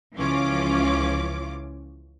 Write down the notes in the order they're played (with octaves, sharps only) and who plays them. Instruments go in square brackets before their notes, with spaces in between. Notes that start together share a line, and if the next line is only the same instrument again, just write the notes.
[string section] C#2 E3 F3 C#4 F4 D6